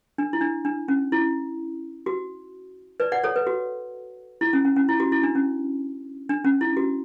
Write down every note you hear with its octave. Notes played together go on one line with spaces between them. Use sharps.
D4
E4
D4
D4
C#4
E4
F#4
B4 D5
D5 F#5
A4 C#5
B4
F#4
E4
C#4
C#4
C#4
E4
F#4
E4
D4
C#4
D4
C#4
E4
F#4